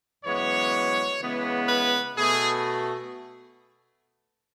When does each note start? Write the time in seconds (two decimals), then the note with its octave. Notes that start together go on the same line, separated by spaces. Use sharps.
0.25 F#2 E3 G#3 B3 C#5
1.20 C#3 E3 G#3 B3
1.69 B4
2.17 B2 A3 G#4